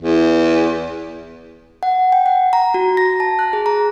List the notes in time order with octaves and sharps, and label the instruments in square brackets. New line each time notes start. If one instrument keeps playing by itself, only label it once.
[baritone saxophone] E2
[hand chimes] F#5
G5
F#5
A#5
F#4
A#6
A5
F#6
G#4
A#5